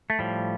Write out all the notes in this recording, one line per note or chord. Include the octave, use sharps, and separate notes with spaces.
A3
A2 F3 G3